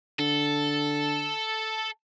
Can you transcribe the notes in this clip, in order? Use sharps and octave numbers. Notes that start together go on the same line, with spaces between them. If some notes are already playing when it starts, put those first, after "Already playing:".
D3 A4